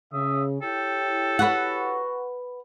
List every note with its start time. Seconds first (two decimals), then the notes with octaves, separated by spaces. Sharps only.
0.12 C#3 E5 D#6
0.62 E4 G4 A4 C#5 G5
1.39 F#4 B4 F#5